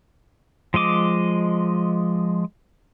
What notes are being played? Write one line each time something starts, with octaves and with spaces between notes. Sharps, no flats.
F3 G#3 D#5 D6